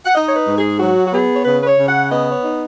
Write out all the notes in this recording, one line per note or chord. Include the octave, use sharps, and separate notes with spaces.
F#5
D#4 D#5
C#5
B4
G#2
G#4
F#3 F#4
F#4
B3 G#4
C#5
C#3 B4
B4
C#5
C#3
F#5
B3 D#5
C#5
D#4